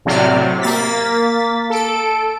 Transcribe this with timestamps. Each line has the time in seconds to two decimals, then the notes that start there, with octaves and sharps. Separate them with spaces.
0.05 A2 C3 F#3 D5 F6
0.35 C3
0.61 A#3 A6 B6
1.70 A4 D7